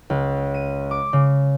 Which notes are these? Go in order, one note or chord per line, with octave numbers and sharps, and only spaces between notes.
C#2
D#7
D6
C#3